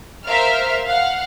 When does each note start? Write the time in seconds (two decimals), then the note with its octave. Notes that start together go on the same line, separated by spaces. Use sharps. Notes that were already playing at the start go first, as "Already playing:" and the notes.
0.25 A#4 C5 E5 F5 F6
0.87 F5 F#5